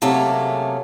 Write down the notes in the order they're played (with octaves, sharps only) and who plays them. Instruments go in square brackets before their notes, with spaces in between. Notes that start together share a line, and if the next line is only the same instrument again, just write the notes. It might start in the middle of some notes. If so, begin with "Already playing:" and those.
[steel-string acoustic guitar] C3 F#3 A3 A#3 C#4 G#4